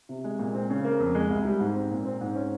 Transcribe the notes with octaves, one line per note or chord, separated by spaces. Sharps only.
C3
G#3
A#2
C4
C#3
A#3
F2
G#3
C2
G3
G#2
C4
A#2
C4
G#2
C#4